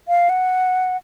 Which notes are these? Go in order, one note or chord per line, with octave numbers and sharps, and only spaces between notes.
F5
F#5